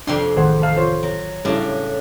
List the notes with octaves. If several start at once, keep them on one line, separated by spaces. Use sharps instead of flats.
F2 C3 D4 G5 C6
A1 D#3 A3 G#4 C5 F#5
A4 F5 A5
F4 C5 C#5
F#3
A2 C#3 G3 D4 E4